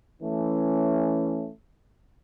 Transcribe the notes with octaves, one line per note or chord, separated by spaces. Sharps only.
E3 A3 C#4